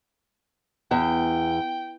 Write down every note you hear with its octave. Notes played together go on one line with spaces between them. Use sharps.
E2 G5